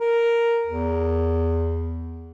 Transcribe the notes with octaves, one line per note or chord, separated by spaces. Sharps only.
A#4
E2